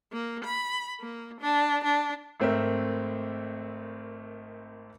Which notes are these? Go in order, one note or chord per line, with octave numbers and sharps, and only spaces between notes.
A#3
B5
A#3
D4
D4
G#1 A3 C4 A#4 E5